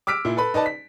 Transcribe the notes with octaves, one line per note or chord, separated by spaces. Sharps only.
D6 E6 F6 B6 D7
A#2 E4
A4 B4 B5
D#4 B4 D5 A5
B6